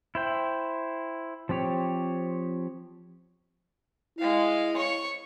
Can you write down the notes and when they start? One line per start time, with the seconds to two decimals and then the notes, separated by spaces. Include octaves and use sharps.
0.15 E4 C5 G5
1.49 F3 C4 G4 C#5
4.19 G#3 E4 F5
4.77 C#5 C#6